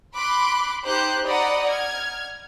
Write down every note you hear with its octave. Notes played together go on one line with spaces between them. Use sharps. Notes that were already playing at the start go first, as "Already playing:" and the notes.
B5 C6 D6 F#6
D#4 G4 C5 F#6 G6
D5 D#5 F#5 A#5 B5 D#6
F6 G#6